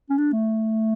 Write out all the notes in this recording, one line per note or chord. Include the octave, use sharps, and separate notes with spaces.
C#4
D4
A3